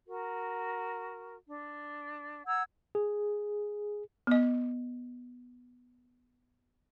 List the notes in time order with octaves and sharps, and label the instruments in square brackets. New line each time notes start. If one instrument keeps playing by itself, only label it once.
[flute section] F#4 A#4
D4
F#5 A#5 E6 G#6
[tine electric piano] G#4
[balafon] B3 D#5